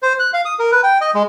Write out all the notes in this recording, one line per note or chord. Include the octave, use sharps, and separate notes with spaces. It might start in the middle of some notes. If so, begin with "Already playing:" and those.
C5
F#6
F5
D#6
A#4
B4
G5
D#5
G#3